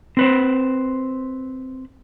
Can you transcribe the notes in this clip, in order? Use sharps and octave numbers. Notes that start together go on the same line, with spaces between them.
C4 B4 C5